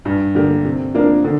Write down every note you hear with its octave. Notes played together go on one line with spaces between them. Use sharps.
G2
D3 A#3 G4 A#4
C3
F3 A#3 D4 A#4
D3